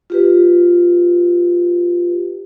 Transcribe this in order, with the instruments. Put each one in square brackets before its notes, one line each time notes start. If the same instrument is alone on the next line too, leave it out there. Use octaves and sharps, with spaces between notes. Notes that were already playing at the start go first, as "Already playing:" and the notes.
[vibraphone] F4 G4 B4